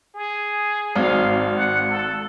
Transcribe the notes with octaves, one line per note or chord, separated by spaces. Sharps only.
G#4
G#1 F5
F#5
A4